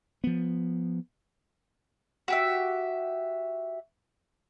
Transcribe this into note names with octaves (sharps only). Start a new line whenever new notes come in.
F3 B3
F#4 G4 E5